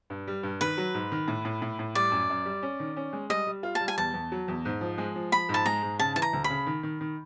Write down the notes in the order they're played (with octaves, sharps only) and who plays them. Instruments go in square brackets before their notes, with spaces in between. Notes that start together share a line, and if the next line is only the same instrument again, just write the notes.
[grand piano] G2
G3
G2
[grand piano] D#3 [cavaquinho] B4
[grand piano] F#3
G#2
D#3
A2
A2
A2
A2
[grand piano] G3 [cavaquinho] D5
[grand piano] F#2
F#2
G3
C#4
D#3
C#4
G#3
[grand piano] G3 [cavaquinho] D#5
[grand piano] G3
F4
[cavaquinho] A5
[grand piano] G3
[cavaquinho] G#5
[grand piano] E2 [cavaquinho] A5
[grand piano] E2
F#3
E2
G#2
F3
G#3
F3
[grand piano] F3 [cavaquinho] B5
[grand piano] G#2
[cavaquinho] A5
[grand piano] G#3 [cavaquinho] A#5
[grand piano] G#2
[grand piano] C#3 [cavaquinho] A5
[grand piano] E3 [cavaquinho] A5
[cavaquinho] A#5
[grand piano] D2
[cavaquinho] B5
[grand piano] C#3
D#3
D#3
D#3